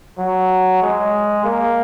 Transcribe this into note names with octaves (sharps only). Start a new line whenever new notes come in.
F#3
G#3
A#3